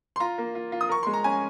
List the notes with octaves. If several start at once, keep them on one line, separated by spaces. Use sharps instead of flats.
C6
F4 A#5
A#3
F4
F4
D#6
A#4 C#6
G#3 C6
A#5
C#4 G#5